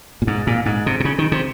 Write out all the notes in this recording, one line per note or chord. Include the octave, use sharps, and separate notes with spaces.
A#2
G#2
A#2
G#2
C3
C3
C#3
D#3
C3